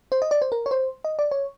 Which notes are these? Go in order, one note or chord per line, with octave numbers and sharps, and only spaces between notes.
C5
D#5
D5
C5
A#4
C#5
C5
D#5
D5
C#5